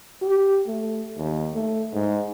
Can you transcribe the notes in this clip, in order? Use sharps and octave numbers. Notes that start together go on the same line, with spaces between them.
G4
A3
D#2
A3
G#2